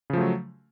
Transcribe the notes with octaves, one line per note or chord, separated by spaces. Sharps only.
C#3 F3 F#3 A3